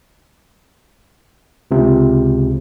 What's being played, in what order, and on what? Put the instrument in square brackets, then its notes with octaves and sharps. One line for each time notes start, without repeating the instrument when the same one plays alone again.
[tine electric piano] C#2 C3